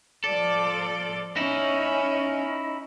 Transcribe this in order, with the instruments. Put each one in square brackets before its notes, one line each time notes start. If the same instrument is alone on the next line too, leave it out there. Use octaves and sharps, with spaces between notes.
[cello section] F3 D5 [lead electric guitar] A4
[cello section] C#4 [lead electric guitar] D#4 E4